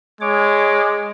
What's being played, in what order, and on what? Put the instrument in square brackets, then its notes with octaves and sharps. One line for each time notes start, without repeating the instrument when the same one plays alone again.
[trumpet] G#3 [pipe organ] C#5 D6